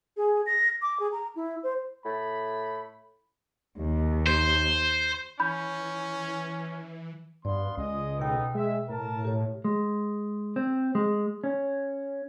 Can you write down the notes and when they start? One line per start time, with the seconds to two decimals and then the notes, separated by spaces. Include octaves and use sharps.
0.17 G#4
0.46 A#6
0.82 D6
1.00 G#4
1.12 A#5
1.36 E4
1.63 C5
2.05 A2 B5
3.79 D#2
4.26 C5
5.40 E3 C#4 B5 G6
7.45 G2 B3 D5 F5 C6
7.77 C#2 G#3 D#5
8.19 B2 B3 D#4 A4 G5
8.55 G#3 E5
8.89 A2 A#4 A5
9.25 G4 C#5
9.65 G#3
10.56 C4
10.95 G#3
11.44 C#4